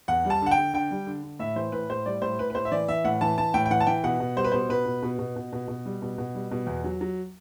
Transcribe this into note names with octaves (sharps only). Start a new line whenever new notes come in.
E2 F#5
G3
A5
D3 F#5
G5
D3
D3 G5
G3
D3
D3
A2 E5
E3 C5
A2 B4
A2 C5
G3 D5
A2 C5
A2 B4
B4
A2 C5
E5
E3 D5
E3 E5
A2 F#5
E3 A5
E3 A5
A2 G5
G5
E3 F#5
A5
E3 G5
B2 F#5
B2
G3 C5
B4
B2 C5
B2 B4
B2
B2
B2
B2
B2
B2
G3
B2
B2
G3
B2
E2
F#3
F#3